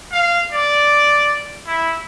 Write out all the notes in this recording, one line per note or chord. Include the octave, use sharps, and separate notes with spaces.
F5
D5
E4